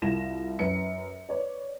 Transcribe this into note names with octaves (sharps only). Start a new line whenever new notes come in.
C2 F4 A#6 E7
F#2 B4 C#7
B4 C#5 D5